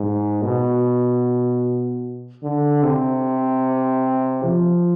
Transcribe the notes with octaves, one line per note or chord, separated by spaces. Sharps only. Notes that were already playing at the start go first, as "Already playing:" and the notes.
Already playing: G#2
B2
D3
C3
F3